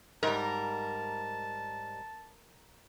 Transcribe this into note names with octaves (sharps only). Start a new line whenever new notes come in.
G#2 G3 A#4 A5